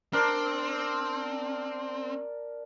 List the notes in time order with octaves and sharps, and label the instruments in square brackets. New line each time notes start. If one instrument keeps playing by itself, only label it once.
[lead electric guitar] C4 [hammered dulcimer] D4 A#4